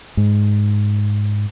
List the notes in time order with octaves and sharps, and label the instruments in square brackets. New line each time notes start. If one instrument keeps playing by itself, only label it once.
[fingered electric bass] G#2